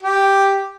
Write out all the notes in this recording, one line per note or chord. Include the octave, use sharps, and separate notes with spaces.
G4